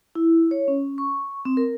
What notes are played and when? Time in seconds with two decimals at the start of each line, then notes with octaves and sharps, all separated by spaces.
0.15 E4
0.51 C#5
0.68 C#4
0.98 C#6
1.45 C4
1.57 A#4